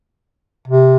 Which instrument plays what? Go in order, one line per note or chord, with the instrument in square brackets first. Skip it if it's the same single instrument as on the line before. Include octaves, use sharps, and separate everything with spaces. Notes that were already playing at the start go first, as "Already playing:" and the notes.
[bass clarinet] C3